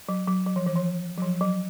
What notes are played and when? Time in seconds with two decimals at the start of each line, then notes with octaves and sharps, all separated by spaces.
0.09 F#3
0.28 F#3
0.46 F#3
0.56 F3
0.66 E3
0.76 F3
1.18 F#3
1.22 F3
1.41 F#3